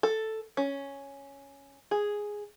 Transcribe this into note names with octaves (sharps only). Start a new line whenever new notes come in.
A4
C#4
G#4